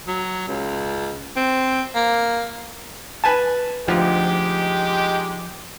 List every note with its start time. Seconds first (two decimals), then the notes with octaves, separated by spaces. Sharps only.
0.07 F#3
0.48 C#2
1.36 C4
1.95 A#3
3.24 B4 G#5 A5
3.88 D2 F3 G#3 D#4 G4